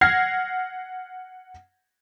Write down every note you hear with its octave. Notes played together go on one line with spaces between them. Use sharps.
F#5 F6 G#6 A#6 C7